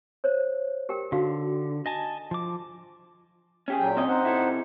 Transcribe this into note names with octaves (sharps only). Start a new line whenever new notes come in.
C5 C#5
G4 A#4 G5
D3 D#4 F#4 F5
D#5 G#5 A5
F3 D6
C#4 G4 G#4
A#2 F#3 G5
C4 C#4 D#5
D#4 C5 F#5
C3 E4 A4